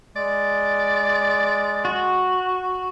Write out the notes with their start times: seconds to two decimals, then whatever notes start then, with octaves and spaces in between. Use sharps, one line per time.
0.16 G#3 D5
1.85 F#4